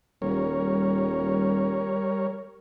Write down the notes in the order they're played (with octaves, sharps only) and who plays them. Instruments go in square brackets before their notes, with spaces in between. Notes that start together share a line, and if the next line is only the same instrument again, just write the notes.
[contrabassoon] D#1 [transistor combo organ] G3 A#4 C#5